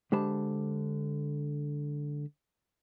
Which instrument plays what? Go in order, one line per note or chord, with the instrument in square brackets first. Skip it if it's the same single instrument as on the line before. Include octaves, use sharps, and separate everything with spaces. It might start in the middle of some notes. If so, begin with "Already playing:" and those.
[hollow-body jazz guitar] D3 G#3 G4 C5 A5 B5